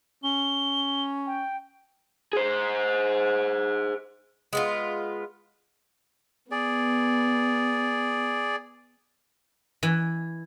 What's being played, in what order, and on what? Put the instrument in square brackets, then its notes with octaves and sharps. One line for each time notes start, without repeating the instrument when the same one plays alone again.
[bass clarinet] C#4 [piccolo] G7
[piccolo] G5
[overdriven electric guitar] G#4 C5
[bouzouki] G#3 B3 F4
[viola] B3 [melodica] G#4 D5
[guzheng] E3